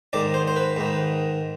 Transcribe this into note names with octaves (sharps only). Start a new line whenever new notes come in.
G#2 D#3 D5
C5
C5
B4
G#2 D#3